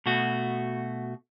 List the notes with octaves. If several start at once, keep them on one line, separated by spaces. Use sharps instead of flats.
B2 A3 F#4